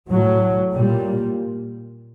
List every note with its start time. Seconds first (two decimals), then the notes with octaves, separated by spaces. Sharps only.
0.10 A2 F#3
0.74 A#2 G3